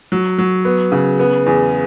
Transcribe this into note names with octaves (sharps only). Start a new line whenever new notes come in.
F#3
F#3
B3
C#3
B3
E2